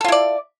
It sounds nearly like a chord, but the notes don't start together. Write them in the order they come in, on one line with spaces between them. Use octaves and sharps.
A4 F4 E4 D5